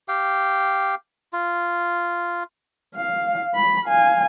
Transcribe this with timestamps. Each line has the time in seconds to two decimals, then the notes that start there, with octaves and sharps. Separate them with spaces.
0.08 G4 F5 G5
1.33 F4
2.96 F5
3.55 B5
3.85 F5 G#5